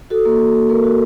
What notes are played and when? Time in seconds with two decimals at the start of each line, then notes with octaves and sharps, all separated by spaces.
0.10 F#4 A4
0.25 A#3
0.40 F#4
0.55 A#3
0.69 A#3 A#4
0.84 F#4